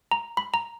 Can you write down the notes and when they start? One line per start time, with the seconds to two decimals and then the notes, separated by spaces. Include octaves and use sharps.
0.11 A#5
0.37 B5
0.54 A#5